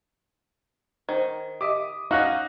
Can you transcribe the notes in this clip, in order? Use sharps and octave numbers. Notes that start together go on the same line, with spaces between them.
D#3 C5
G4 D#5 E5 D6 D#6
C#4 D#4 F#4 D#5 F5 F#6 A#6